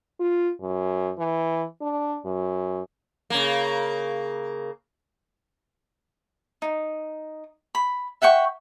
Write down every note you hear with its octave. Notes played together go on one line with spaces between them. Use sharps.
F4
F#2
E3
D4
F#2
C#3 A#3
D#4
B5
E5 F#5 G5 C#6